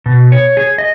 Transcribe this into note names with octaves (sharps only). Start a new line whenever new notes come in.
B2
C#5
G#4
D#5